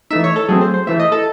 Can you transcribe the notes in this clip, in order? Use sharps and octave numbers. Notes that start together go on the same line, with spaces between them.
E3 A3 D#4 E5
C#5
A4
F#3 A3 C4 G#4
C5
C5
A2 E3 A3 E5
D#5
A4